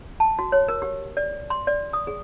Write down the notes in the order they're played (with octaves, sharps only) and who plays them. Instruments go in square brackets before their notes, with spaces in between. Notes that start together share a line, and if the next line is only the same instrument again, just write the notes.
[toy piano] A5
F#4
C#5
A#4
G4
D5
C6
D5
D#6
G#4